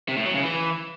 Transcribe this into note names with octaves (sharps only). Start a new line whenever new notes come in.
C3
A2
F#3
C#3
E3